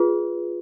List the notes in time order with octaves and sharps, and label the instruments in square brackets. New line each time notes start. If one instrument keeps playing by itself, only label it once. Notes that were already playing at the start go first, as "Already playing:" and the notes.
Already playing: [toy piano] F4 G#4 B4